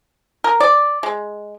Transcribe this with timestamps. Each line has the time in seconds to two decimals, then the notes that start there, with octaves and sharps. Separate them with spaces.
0.44 A#4
0.60 D5
1.03 G#3